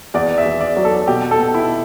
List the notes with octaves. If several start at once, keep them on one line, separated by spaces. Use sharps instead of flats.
E2 D5
E5
E2
D5
F#3
A4
B2 G4
A4
B2
E4